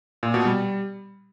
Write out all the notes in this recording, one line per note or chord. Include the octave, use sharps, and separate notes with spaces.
A#2
B2
G3